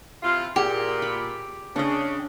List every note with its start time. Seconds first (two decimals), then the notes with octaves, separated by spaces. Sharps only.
0.23 C3 E3 F4
0.56 A#2 G4 G#4
1.02 B5
1.76 C#3 D4 D#5